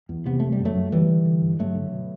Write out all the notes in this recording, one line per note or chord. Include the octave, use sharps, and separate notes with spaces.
E2
C3 B3
E2 A3
G3
F#2
F#3 A3
F#2
D3 E3 G3
D3
D3
G2
G2 F#3 A3
D3
B2